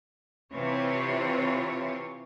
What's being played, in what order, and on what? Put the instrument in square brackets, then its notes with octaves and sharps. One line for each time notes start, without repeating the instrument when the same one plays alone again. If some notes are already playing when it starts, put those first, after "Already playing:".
[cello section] C3 E3 C4 F4 C#5